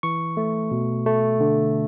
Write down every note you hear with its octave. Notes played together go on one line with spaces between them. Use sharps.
E3 C#6
A3
B2
A3
D3